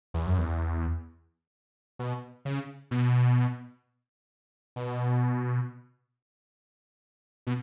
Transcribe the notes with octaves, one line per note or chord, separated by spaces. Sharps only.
E2
F#2
E2
B2
C#3
B2
B2
B2